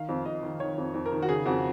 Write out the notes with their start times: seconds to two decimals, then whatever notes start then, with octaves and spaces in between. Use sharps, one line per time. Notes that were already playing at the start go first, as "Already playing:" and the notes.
Already playing: D#3 F5
0.09 F2
0.25 F2 D#5
0.43 D#3
0.60 D#3 C#5
0.78 F2
0.94 F2
1.06 A#4
1.12 D#3
1.22 F#4
1.29 C#3 G#4
1.46 F2 F#4